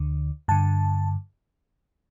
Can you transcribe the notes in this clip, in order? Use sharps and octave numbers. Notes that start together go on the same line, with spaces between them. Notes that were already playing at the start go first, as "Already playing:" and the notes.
Already playing: D2 D3
G2 D3 A5